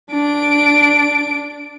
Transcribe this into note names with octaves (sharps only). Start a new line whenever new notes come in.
D4 D7